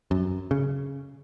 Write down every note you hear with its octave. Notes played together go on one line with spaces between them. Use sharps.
F#2
C#3